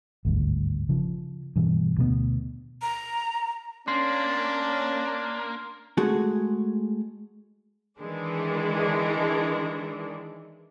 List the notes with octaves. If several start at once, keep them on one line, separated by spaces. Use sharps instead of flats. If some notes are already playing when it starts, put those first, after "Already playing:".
G#1 D2 G2
C#3 F3
G2 B2 E3
D2 B2 F#3 B3
A#5
A#3 C#4 D4 C6 C7
G#3 A3 F#4 G#4
D#3 E3 G#3 D4